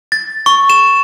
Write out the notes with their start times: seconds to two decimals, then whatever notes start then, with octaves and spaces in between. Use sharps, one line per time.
0.12 A6
0.46 C#6
0.70 E7